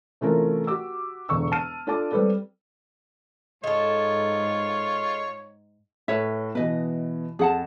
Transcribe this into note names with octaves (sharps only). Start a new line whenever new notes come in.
C3 E3 A3 C#4 F4 A#4
F#4 G4 D6 E6
E1 D3 C#6 E6
A5 F6 D#7
D4 F4 A4 D5 A5 D6
G3 C4 A4 B4 D5
G#2 G#3 F4 A4 C#5
A2 B4 C#5 E5
B2 E3 B4 D#5
F2 G#4 F#5 A5